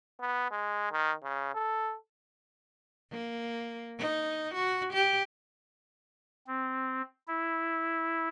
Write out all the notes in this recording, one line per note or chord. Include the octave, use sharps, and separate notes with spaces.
B3
G#3
D#3
C#3
A4
A#3
D#4
F#4
G4
C4
E4